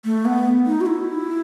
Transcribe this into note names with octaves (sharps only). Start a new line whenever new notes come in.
A3
B3
D#4
F#4
E4